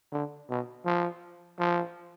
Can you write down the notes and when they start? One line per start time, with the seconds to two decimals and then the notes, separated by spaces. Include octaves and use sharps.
0.13 D3
0.50 B2
0.86 F3
1.59 F3